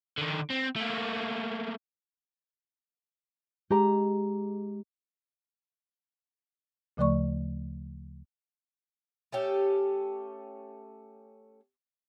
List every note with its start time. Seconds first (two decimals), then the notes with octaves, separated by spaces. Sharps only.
0.18 D3 D#3
0.50 C4
0.76 A3 A#3
3.71 G#3 G4 A#5
6.97 D2 C#3 F3 A3 D5 C#6
9.32 A3 C#4 G4 A4